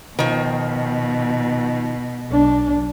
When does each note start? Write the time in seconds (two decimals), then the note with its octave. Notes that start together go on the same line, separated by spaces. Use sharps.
0.19 B2 D#3 F3
2.31 B1 D4